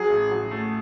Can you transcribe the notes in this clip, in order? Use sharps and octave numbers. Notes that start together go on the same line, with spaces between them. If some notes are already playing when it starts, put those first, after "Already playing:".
Already playing: F#3 G#4
A1
F#3
A3